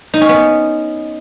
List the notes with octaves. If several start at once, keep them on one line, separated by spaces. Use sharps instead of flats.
D#4
C#4
B3